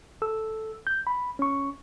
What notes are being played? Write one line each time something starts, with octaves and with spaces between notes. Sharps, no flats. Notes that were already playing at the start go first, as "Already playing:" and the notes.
A4 E6
G6
B5
C#4 C#6